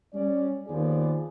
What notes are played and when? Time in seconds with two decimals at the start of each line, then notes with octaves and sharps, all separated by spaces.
0.14 G3 C#4 D5
0.67 D#2 D#3 F3 B3 G#4 D5